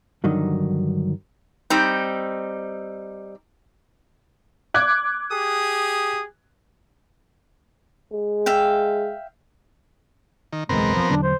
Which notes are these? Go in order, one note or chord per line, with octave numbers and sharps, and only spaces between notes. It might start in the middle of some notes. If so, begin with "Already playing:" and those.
G2 D3 D#3 F#3 D#4
G3 C4 D#4
D6 F#6 G#6
G4 G#4 D#6
G#3
E5 F5 G5
D#3
F#1 B1 E2 G#3 B3 C4 A#4
F3
E2 D3 F#3 D4
C5